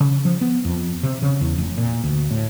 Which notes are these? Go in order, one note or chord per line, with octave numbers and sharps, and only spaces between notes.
C#3
F3
B3
F2
C3
C#3
E2
F1
A#2
D2
A2